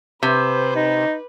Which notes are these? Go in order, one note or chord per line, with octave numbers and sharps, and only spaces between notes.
C3 B4 C5
D#4